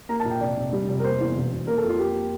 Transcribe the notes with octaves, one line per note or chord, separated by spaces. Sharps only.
A#3 A#5
A5
A#1
G5
F1 D5
F1
G3
F1
A#4
A#3 C5
E2
E1
E1
A#3 A#4
A4
F2
F4
A#3 G4